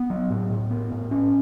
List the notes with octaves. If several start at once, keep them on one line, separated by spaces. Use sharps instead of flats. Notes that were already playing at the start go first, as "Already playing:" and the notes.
Already playing: B3
F#3
A2
A2
B3
A2
C#4